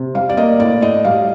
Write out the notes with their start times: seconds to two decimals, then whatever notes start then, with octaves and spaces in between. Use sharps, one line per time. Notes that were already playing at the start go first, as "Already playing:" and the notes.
Already playing: C3
0.15 G3 F5
0.29 D5
0.37 A#3 D#5
0.60 A2 D5
0.82 A2 D#5
1.05 G3 F5